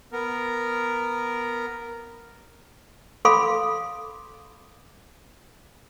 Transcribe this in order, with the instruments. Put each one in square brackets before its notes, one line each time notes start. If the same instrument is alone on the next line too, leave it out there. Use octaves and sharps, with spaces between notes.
[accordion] B3 A#4
[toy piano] A4 F5 B5 C6 D6